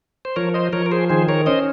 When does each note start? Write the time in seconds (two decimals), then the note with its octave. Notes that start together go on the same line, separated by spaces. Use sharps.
0.25 C5
0.36 F3 A#4 C#5
0.54 C5 D#5
0.73 F3 A#4 C#5
0.86 A#4
0.92 G#4 C5
1.09 D#3 G#4 C5
1.29 A#4 C#5
1.46 C#4 C5 D#5